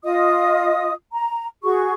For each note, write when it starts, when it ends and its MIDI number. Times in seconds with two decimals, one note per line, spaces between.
0.04 0.92 65
0.04 0.92 75
0.04 0.92 87
1.12 1.45 82
1.63 1.93 66
1.63 1.93 68
1.63 1.93 85